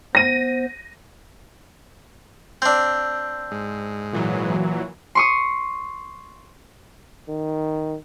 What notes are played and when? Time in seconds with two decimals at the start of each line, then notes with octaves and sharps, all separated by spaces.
0.15 B3 C5 A#6 D#7
2.62 C4 D4 E6 G6
3.51 G#2
4.13 A#2 E3 F#3
5.15 C6 C#6 D#6
7.28 D#3